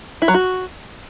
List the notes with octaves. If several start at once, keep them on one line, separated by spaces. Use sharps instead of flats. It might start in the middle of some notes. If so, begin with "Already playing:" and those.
E4
F#3
F#4